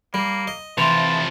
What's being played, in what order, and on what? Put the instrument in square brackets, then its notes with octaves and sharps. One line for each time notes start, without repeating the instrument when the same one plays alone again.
[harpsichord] G3 [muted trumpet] A#3
[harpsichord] D#5
[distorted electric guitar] C3 F3 [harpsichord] E3 [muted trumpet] A5 [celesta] C6 F7